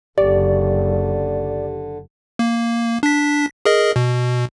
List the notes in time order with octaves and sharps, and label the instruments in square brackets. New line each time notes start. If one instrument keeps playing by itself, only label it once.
[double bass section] F#1 [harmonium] D3 [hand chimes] G4 [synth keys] D5
[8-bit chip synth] A#3
D4 B6
G#4 A#4 D#5
B2